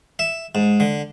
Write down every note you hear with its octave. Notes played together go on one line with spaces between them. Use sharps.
E5
G#2
D3